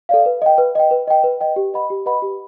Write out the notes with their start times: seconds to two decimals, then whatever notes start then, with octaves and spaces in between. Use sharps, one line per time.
0.09 A4 D5 F5
0.26 B4
0.42 D#5 G5
0.58 B4
0.75 D#5 G5
0.91 B4
1.08 D#5 G5
1.24 B4
1.41 D#5 G5
1.56 G4
1.74 B4 D#5 F#5 B5
1.90 G4
2.06 B4 D#5 F#5 B5
2.22 G4